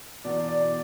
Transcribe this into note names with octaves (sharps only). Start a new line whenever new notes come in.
E2 B2 D5
D5